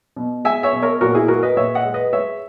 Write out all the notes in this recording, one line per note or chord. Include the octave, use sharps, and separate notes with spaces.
B2
G#3 E5 G#5
C#5 E5
B2
A#4 C#5
A#2 F#4 A#4
E4 G#4
G#3 F#4 A#4
B4 D#5
A#2 C#5 E5
D#5 F#5
G#3
B4 D#5
G#3 C#5 E5